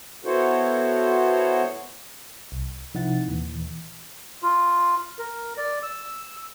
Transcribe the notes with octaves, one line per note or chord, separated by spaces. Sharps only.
B3 E4 F#4 A4 C5 C#5
C2
C3 F3 D#4 E4 F#5 A6
D#2 A#2 E3
F4
A#4
D5
E6